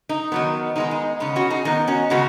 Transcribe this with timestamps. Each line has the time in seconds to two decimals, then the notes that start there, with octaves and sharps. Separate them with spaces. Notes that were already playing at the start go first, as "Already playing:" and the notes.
0.09 D#4
0.32 D#3 F#3 B3
0.76 D#3 G#3 B3 D#4
0.91 D#4
1.20 C#3 B3 D#4
1.36 C#4 F#4
1.50 D#4 G#4
1.65 D#3 B3 D#4
1.88 C#4 F#4
2.10 C#3 G#3 B3 C#4 F#4